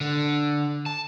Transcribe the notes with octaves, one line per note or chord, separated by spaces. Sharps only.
D3
A5